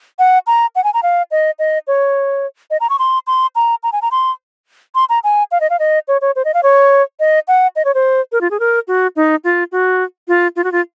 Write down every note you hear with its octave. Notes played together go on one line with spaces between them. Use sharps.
F#5
A#5
F#5
G#5
A#5
F5
D#5
D#5
C#5
D#5
A#5
C#6
C6
C6
A#5
A#5
G#5
A#5
C6
C6
A#5
G#5
F5
D#5
F5
D#5
C#5
C#5
C5
D#5
F5
C#5
D#5
F#5
D#5
C#5
C5
A#4
F4
G#4
A#4
F#4
D#4
F4
F#4
F4
F4
F#4
F4